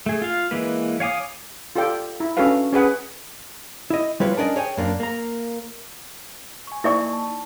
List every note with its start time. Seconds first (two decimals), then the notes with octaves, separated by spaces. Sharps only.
0.06 A3 G#4
0.22 F4 F5
0.51 E3 G#3 A#3 B4
1.00 C#5 F5 G#5 D6 D#6
1.76 F4 G4 A4 D5 G5
2.20 E4
2.37 C#4 D4 F#4 A4 B4 F5
2.73 C#4 G#4 B4 F#5 G#5
3.90 E4 D#5
4.20 G3 E4 F4 B4 C#5
4.37 C#4 D4 A#4 D5 D#5
4.56 G#4 C#5 G5 G#5
4.77 F#2 A#3 D4
5.00 A#3 A#5
6.67 G#5 C#6
6.84 A#3 D#4 E4 D5 C#6
7.13 A5